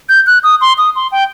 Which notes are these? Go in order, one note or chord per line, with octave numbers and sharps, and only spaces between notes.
G6
F#6
D#6
C6
D#6
C6
G5